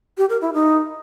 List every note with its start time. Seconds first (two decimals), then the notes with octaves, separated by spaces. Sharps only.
0.18 G4
0.30 A#4
0.42 E4
0.54 D#4